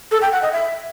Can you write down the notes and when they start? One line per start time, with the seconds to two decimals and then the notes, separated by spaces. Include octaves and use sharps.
0.11 A4
0.22 G5
0.32 F#5
0.42 D#5
0.52 E5